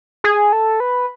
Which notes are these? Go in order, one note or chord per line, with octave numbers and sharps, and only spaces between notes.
G#4
A4
B4